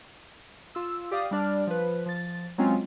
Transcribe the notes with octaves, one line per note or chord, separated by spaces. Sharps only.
F4 E6
G4 D5 F5 D#6
G3 D4 D5 F6
F3 B4
F3 A6
F#3 G#3 C4 C#4 F4